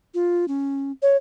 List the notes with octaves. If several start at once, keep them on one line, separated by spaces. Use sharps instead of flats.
F4
C#4
C#5